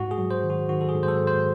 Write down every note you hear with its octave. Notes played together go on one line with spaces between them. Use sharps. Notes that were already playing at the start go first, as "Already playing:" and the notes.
Already playing: G#2 F#4
G#4
F#3
C5
D#3
F#4
D#3 F#4
A4
G#4
G#2
C5
A4
G#2
C5